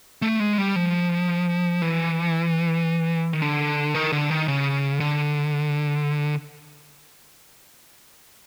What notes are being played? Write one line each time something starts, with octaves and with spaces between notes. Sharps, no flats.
A3
G#3
G3
F3
E3
D#3
D3
D#3
D3
D#3
C#3
D3